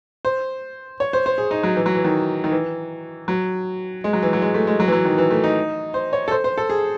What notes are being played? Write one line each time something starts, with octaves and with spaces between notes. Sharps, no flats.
C5
C#5
C5
C5
G#4
D#4
F#3
E3
F#3
E3
D#3
D#3
E3
F#3
G#3
F#3
E3
F#3
G#3
A3
G#3
F#3
E3
F#3
D#3
E3
A3
D#4
C5
C#5
A4
C5
C5
A4
G#4